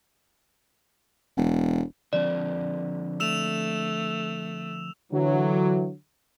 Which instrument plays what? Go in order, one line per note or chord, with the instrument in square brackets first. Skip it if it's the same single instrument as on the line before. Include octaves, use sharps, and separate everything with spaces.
[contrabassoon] E1
[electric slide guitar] D3 F3 C4 [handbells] D5
[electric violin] A3 [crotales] E6 E7 F7
[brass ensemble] D3 E3 F#3